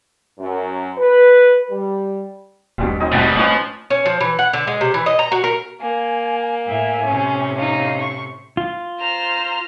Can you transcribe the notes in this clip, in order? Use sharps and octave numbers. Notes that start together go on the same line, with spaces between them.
F#2
B4
G3
D#1 D2 G2 B2
F#2 C4 D#4 D#5
G#1 D2 B2 G3 F#5 G5 A5
A2 F3 C#4 D#4 F4 B4
C#4
F3
E3
F#5
D3
G#3
C3
E3
D#5
A#5
F#4
A#4
A#3 G#5
A2 E5 G#5
A2 C3 C#4
C#4 D#4 F5
C#6
F4
C5 A#5 F6